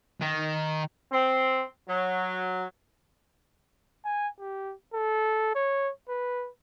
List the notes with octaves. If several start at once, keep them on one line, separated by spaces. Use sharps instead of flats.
D#3
C4
F#3
G#5
G4
A4
C#5
B4